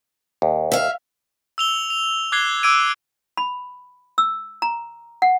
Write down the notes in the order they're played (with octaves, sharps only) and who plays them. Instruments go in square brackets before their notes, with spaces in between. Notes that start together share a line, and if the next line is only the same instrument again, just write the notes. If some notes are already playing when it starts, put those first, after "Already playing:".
[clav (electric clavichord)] D#2
[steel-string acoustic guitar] E5 F5
[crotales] E6 F7 G7
F7
D6 F#6 G#6 C7 G7
D6 E6 G#6 D7 D#7
[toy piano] B5
E6
A#5
F#5